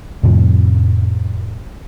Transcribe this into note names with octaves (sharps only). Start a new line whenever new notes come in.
F2 A2 C3 F3